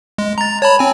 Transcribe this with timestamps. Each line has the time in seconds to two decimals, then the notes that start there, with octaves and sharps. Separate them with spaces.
0.18 G#3
0.38 A#5 A6
0.62 C#5 A5 B5
0.79 C4 G#5